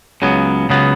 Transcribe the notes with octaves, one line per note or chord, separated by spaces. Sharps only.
C#2 C#3 F#3 B3
C#2 C#3 F#3 B3